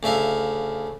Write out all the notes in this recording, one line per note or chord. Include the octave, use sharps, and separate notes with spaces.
D2 C#3 E5 F5